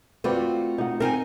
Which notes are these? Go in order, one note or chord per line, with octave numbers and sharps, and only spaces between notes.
A3 C4 F4 F#4 B4 D5
D#4 F#5
C4 D#4 A#4 G#5